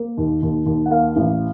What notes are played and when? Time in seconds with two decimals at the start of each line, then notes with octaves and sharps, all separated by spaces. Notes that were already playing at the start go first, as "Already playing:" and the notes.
Already playing: A#3
0.17 D#2
0.42 D#2
0.66 D#2
0.86 F#5
0.91 A#3 F5
1.16 A1